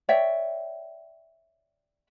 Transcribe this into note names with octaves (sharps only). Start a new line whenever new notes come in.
C#5 D5 E5 G5